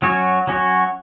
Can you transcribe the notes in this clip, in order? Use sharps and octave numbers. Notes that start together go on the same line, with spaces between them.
F#3 C#4 F#4 C#5
F#3 C#4 F#4 C#5